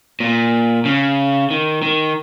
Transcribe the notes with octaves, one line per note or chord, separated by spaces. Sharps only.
A#2
C#3
D#3
D#3